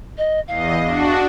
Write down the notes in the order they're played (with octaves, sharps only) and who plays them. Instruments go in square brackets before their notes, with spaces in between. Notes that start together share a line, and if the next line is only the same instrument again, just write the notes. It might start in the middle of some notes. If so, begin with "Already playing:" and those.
[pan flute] D#5
[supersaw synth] E2 D#5 [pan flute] F5
[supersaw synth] D4 F#4